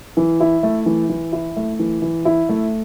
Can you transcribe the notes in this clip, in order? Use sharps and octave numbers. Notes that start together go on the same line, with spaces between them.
E3
E4
A3
E3
E3
E4
A3
E3
E3
E4
A3